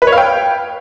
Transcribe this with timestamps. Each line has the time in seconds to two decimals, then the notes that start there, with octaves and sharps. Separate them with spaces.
0.02 B4
0.07 C#5
0.12 F5
0.18 G5